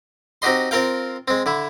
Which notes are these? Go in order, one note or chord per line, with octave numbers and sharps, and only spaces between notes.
C4 D#4 F#4 G4 D#5 C6
C4 F4 A#4 F5 G5
G#3 C4
D3 E4